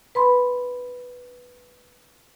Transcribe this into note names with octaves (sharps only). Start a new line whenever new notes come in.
B4 B5 C6